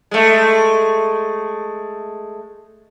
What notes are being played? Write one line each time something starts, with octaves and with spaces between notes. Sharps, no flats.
G#3 A3